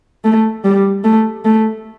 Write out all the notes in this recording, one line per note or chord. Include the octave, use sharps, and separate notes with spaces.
A3
G3
A3
A3